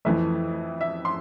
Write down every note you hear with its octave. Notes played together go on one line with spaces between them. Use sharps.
F2 E3 A3 E5
E5
C6